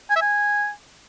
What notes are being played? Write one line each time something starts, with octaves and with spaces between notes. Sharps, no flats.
G#5
E5
G#5